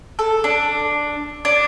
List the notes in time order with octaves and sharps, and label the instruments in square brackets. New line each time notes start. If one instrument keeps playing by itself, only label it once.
[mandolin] A4
D4
D4